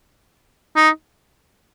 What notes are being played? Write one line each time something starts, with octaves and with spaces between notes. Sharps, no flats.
D#4